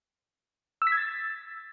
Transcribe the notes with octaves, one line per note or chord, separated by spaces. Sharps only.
E6
B6
G#6
A6